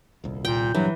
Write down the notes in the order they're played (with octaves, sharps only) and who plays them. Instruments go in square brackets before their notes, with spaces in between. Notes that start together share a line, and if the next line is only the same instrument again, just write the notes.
[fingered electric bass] D#1 C2
[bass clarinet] A#2 [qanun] G5
[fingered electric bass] A#1 G2 [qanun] E3 [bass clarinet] F#3